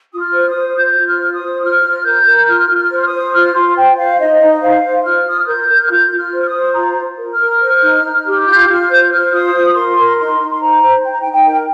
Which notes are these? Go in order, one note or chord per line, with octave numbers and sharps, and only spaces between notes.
F4 D#6
F6
C5
D#6
C5
F4 G6
F4
F6
C5
D#6
C5
F4 F6
F4
A#4 G6
A#4
F4 F6
F4
F6
C5
F6
D#6
C5
F4 F6
F4 C6
C5 G5
C5 F5
D#4 D#5
D#4
C5 F5
C5
F4 F6
F4 D#6
F6
A#4 G6
A#4
F6
F4 G6
F4
F6
C5
F6
D#6
C5
F4 A#5
F4
A#4
F6
A#4
C5
D#4
D#4
G4
F4 G6
F4 F6
C5 G6
C5 F6
F4 D#6
F4
A#4 C6
A#4
D#4 C6
D#4
C6
C5 A#5
C5
D#4 G5
A#5
G5
D#4
G5
A#4